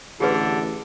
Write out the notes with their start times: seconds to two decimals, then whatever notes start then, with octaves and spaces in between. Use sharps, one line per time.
0.20 A1 D3 G4 G#4 B4